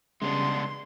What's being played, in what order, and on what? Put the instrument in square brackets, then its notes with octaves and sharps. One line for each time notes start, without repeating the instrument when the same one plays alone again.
[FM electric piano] C#3 G3 [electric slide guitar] G#3 B3 D4 [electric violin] C6